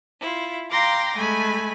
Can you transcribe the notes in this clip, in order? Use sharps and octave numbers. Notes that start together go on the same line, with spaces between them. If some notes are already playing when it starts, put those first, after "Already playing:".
E4 F4
F5 G5 A#5 C6 D6 A#6
G#3 A3 G#5 B5